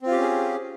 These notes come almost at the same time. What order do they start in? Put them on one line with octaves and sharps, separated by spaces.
C4 F4 G4 C#4 G#4